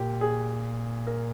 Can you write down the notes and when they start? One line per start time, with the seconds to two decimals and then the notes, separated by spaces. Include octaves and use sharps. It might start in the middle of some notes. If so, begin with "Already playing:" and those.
Already playing: A#2 G4
0.21 G#4
1.07 A#4